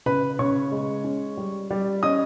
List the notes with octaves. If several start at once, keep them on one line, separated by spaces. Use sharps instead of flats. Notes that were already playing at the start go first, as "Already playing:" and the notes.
C#3 B4 B5
C#3 C#5 C#6
G#3
C#4
G3
G3
C#4 D#5 D#6